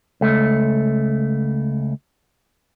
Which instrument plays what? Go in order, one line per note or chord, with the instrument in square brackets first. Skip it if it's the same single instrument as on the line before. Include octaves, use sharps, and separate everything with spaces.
[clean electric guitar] C#2 A3